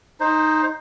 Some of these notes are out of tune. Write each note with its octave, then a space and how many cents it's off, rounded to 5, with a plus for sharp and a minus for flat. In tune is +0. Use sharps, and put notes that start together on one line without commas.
D#4 +0 C5 +10